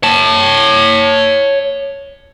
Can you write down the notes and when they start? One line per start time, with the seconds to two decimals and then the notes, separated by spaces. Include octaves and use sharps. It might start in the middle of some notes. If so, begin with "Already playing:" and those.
0.03 C#5 A5